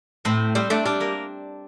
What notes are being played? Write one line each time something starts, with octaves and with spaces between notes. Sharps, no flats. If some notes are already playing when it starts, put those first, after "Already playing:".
A2 C4 C5
G3 C4 C5
A3 D4 D5
G3 D4 D5
A#3 A#4